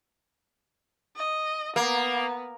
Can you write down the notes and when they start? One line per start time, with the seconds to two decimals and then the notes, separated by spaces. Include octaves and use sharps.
1.16 D#5
1.76 A#3 B3